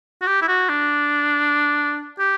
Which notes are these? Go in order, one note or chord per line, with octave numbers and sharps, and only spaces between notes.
F#4
G4
E4
F#4
D4
G4